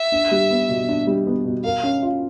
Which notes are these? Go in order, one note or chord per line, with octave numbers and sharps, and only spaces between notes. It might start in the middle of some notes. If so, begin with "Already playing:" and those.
Already playing: E5
D4
G3
B3
B2
D4
G3
B3
B2
A#4 F5
C#4
F4